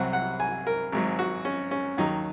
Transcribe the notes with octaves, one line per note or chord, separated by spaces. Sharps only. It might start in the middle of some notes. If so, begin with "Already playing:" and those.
Already playing: C2 C3 F#3 F#5
F#5
G#5
A#4
G#1 G#2 F#3
F#4
C#4
C#4
D#2 D#3 F#3 D#4